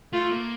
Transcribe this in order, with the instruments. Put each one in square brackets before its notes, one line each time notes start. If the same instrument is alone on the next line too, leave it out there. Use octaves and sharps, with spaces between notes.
[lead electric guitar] A3 [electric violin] F4
[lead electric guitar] A#3